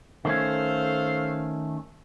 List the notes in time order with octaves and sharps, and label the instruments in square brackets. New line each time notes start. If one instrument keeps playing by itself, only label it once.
[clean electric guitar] D#3 A3 C#4 [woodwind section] A4 C5 F5